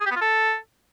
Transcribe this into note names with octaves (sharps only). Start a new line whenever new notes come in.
G#4
G4
B3
F4
A4